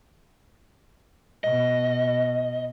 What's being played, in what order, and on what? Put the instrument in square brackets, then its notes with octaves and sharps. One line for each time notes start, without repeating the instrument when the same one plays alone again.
[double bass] B2 [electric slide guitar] D#5